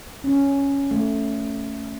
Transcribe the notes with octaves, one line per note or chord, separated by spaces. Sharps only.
C#4
A3